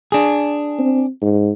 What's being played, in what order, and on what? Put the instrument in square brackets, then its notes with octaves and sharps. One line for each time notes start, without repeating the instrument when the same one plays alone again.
[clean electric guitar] D4 G#4
[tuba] C4
G#2